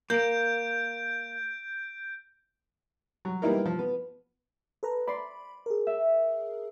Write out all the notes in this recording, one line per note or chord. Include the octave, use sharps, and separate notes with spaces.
A#3 G6 D7
F#3
G3 A#3 B3 D#4 E4 A#4
F3
B3
A4 B4 A#5
D5 B5 C6
G#4 A#4
E5